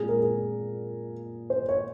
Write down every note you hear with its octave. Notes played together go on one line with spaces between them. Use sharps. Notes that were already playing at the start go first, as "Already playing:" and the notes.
Already playing: A#2 G#3 C4 G#4
A#4
G#4
C5
C#5